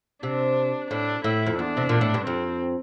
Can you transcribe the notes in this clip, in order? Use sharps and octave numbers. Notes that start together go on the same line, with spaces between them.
C3 D4
A2 D4
A2 E4
F2
E2 D4
C3
A#2
A2
G2
F2 C4